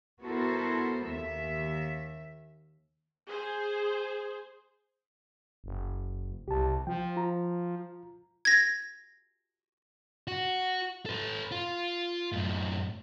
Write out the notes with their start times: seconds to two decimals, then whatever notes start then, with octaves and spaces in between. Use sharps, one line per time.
0.22 B3 E4 F#4 A4 A#4 C5
1.08 D#2 E5
3.28 G#4 C5
5.64 F#1
6.48 C2 G4 A5
6.87 F3 G5
7.17 F4 A#5
8.45 G#6 A#6
10.28 F#4
11.06 A4 B4
11.51 F4
12.32 F#2 A2